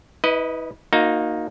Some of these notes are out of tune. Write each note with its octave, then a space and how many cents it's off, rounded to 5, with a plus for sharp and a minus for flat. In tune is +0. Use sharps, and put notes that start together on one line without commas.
E4 -35 B4 +0 D#5 +0
A#3 +0 D#4 +0 F#4 -30